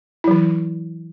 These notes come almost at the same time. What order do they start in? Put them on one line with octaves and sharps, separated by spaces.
E4 F#3 E3